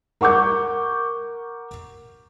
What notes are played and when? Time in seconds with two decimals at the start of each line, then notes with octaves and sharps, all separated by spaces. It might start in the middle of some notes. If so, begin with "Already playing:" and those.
0.21 A#4 F#5 C#6 D6 G6